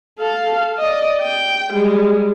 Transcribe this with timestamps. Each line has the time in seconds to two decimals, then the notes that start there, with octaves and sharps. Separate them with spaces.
0.19 A4 F5
0.78 D5 D#5
1.22 G5
1.73 G3 G#3